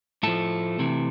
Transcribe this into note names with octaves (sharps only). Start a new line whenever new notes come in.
A2 F3 A3 A4
C3 E3